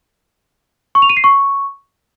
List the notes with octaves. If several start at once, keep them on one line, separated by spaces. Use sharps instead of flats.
C#6
F7
D#7
C7
C#6